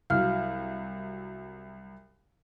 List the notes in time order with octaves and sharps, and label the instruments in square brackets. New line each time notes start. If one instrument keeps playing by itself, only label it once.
[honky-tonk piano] C2 F#3 [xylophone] F5 F6